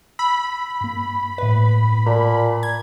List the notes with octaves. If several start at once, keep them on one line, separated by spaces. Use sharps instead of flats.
B5 E6
G2 A#3
A2 B4
A#2 D5 A5 A#5
G#6